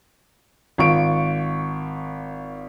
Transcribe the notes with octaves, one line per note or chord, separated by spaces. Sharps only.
G#1 F4 C#6 D7